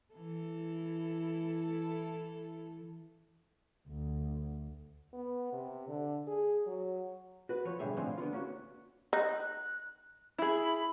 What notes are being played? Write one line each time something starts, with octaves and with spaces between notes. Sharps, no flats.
E3 E4 A4
D2
B3
C3
D3
G#4
F#3
F#4 B4
F3 B4 C#5
G#2 B2 D3 G3 G#4 E5
A2 D3 F3 C4 F5 G#5
D3 B3 F4
A#3 C#4 E4 F#4
D#4 F#6
E4 G#4 B5